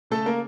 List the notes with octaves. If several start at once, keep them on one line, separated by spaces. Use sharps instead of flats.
C#3 A3 A4
A#3 A#4